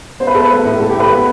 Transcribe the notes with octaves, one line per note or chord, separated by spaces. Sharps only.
B3 C5
B4
B3 A4
B4
A3
A2
A2 A4
G4
A2 B4
B3